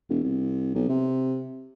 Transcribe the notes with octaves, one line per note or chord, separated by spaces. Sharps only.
E1
C2
B1
C3